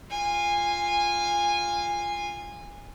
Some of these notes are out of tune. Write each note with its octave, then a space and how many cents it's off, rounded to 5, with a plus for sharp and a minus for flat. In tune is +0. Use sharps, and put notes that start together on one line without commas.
F4 +0 G#5 -20